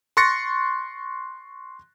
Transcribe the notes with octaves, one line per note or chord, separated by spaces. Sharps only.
C6 C#6 F#6 A6 A#6 C#7